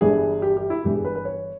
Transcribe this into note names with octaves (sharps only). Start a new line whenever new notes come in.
G1 G2 E3 G3 G#4
G4
G4
E4
G1 G2 E3 G4
G#4
B4
B4
C#5